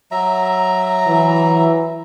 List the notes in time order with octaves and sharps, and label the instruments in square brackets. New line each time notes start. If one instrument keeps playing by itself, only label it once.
[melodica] F#3 E5 A#5
[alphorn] E3